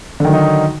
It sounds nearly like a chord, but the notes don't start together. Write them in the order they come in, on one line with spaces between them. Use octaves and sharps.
D3 D#3 F#3 D#4